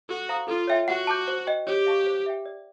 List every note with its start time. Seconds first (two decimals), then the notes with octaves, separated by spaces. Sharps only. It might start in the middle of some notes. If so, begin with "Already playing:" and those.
0.09 F#4 A4
0.29 C5 F5 A#5 D#6
0.48 F4 A4
0.67 C#5 E5 G5
0.88 F#4 F#5
1.07 A5 D6 G6
1.28 C5
1.47 D#5 G5
1.67 G4 C#5
1.86 F5 A5 C#6
2.06 C5
2.26 E5 G5
2.46 D5